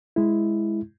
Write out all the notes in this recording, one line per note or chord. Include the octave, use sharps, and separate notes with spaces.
G#3 E4